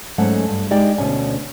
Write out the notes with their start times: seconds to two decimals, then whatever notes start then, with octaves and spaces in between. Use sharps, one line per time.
0.18 G#2 F#3 A3 C#4 F#5
0.49 G2
0.71 G#3 D#4 G4 D5 G5
0.98 D2 B2 C#4 G#5